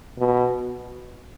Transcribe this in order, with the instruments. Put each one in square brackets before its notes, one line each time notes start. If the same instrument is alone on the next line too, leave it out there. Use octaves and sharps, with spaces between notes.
[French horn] B2